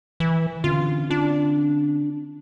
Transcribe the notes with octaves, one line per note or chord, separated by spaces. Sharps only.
E3
D3 C4 C#4 F4
D4